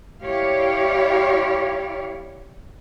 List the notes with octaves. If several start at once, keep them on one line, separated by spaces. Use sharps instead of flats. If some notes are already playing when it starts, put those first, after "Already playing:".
E4 G4 C#5 D5 F5